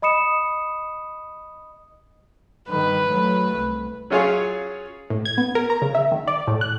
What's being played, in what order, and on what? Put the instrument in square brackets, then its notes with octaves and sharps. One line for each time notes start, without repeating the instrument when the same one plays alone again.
[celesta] D#5 B5 D#6 C#7 E7
[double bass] G2 D#3 [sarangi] B4
[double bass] F#3 A3
C2
[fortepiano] F#3 C#4 F4 G#4 C#5 F5
[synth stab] A2
G#6
B3
A#4
A#5
C#3
E5
D#3
D5
A2
F#6